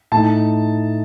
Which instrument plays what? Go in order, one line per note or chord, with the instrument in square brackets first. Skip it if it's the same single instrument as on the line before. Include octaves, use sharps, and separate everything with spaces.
[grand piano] A2 A3 D#4 A5